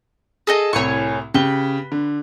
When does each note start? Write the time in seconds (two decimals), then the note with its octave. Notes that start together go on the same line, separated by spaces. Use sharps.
0.47 G#4 A4 D#5
0.73 C2 A2 C#5 G#5 C#6
1.34 C#3 G4 B4 G7
1.92 D3